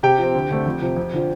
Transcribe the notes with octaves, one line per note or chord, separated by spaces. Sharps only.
C3 G4 G5
F3 C4
D2
D3 A3 C4
F2
C3 F3
F2
D3 F3